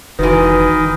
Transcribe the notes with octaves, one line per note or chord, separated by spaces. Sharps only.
F1 G#2 D#3 E3 F#4 B4